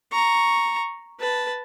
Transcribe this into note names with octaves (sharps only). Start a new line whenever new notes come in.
A#5 C#6
B4 A5